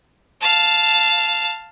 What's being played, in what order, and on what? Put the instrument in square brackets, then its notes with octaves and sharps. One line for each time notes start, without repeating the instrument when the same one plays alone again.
[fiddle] F5 A5